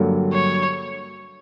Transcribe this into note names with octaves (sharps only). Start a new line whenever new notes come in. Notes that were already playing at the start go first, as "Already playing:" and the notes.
Already playing: G2 D3 F#3 A#3
C#5